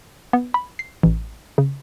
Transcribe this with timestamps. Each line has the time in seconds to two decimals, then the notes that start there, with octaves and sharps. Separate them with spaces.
0.33 B3
0.54 B5
0.79 C7
1.03 A1
1.58 C#3